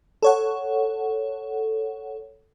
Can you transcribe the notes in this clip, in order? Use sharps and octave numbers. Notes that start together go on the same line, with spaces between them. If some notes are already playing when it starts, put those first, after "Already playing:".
A4 C#5 F#5